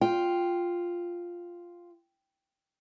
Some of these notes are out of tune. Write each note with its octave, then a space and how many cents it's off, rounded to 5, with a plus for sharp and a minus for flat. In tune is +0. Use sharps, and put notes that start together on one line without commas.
F4 +0 G5 +0